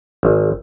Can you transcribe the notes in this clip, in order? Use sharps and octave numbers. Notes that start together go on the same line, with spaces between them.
G#1